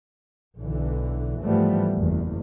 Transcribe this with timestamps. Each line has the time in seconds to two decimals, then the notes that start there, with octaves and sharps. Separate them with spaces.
0.58 B1 D3 E3
1.41 G#2 E3 F3 G3 A3 B3
1.95 F#1 E2